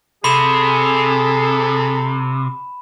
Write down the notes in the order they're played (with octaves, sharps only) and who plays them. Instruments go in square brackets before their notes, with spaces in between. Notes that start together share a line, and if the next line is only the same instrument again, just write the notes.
[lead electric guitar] C3 [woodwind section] G#4 [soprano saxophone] A4 [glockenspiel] B5 E7